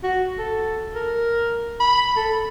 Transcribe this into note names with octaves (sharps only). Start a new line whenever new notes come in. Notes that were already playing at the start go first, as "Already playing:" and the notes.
F#4
A4
A#4
B5
A4